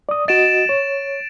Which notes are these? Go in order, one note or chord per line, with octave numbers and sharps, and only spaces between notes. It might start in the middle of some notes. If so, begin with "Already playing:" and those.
D5 D#6
F#4 D#5 A6 D7 E7
C#5